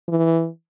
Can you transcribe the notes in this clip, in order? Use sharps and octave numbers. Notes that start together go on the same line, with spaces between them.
E3